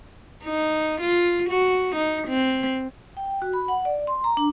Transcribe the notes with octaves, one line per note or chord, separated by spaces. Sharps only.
D#4
F4
F#4
D#4
C4
G5
F#4
B5
F#5
D5
C6
A#5
D4